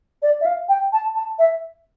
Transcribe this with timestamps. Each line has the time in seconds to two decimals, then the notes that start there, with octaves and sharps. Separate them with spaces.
0.22 D5
0.41 E5
0.46 F5
0.69 G5
0.93 A5
1.15 A5
1.39 E5